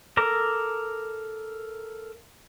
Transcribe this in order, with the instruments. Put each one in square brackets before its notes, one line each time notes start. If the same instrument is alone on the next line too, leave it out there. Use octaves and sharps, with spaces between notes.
[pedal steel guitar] A4 A#4 A#5 D6